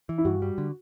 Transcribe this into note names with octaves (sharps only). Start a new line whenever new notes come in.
E3
E4
G2 F#4
G3
D3